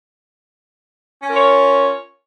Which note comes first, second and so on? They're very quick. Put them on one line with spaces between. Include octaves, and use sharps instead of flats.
C#4 A#4 F4 C#5